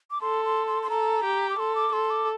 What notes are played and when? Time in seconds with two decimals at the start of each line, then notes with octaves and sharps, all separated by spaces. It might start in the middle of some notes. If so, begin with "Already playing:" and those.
0.11 D6
0.21 A4 C6
0.45 C6
0.67 C6
0.83 C6
0.90 A4 A#5
1.24 G4
1.50 D6
1.58 A4 C6
1.75 D6
1.92 A4 C6
2.10 D6